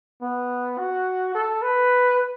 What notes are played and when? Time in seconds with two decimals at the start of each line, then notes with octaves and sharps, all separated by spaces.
0.22 B3
0.79 F#4
1.34 A4
1.62 B4